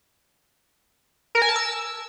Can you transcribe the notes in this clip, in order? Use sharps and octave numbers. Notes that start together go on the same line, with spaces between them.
A#4
G#5
A5
E6